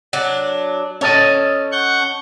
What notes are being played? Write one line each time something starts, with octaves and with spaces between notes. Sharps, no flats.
F#3 D4
C#4 A4 C#5 D#5
F#5 C#6 G6